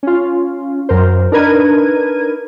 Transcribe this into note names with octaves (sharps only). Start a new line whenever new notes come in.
C#4 F4
F#2 A#4 C5
D4 D#4 A#4 B4 G#6 D#7